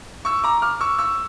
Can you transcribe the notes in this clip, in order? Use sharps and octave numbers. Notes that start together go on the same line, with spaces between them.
C#6 E6
A#5 D6
D6 F6
C#6 E6
C#6 E6